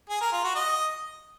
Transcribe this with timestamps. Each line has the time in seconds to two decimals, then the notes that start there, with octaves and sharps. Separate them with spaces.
0.10 G#4
0.21 A#4
0.33 F4
0.44 F#4
0.55 D#5